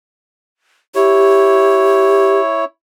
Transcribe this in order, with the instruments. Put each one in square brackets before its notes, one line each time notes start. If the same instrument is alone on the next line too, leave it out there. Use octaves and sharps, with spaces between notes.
[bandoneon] E4 C#5 [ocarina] G4